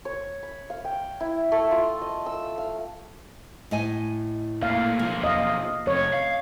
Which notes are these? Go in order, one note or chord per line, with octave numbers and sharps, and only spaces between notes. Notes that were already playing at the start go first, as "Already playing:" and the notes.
C#5
B5
F5
G5
E4
A3
F4
D#5
E6
F5
A2 D#5 G#5
A#2 A3 F5
B1 F3 A#3
D#5 F5
F2 C3 C#5
F5